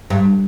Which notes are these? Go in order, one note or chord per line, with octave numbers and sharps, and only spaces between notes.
G2